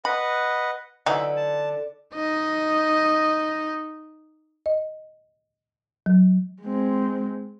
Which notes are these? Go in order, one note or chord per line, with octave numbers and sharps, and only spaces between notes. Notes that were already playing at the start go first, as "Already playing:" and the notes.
B4 D#5 F#5 B5
D3 E3 F#3 D#4 E5
A5
D#4 D#5
D#5
F#3
G#3 C4